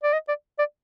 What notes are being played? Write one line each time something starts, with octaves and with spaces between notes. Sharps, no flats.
D5
D#5
D5
D5